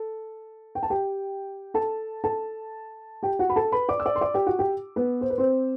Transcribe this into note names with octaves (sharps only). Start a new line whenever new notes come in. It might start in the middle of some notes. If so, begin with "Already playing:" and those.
Already playing: A4
G5
A5
G4 G5
A4 A5
A4 A5
G4 G5
F#4 F#5
B5
A4 A5
B4 B5
D5 D6
E6
D5 D6
C6
D5 D6
G4 G5
F#4 F#5
G4 G5
B3 B4
C5
B4
C4 C5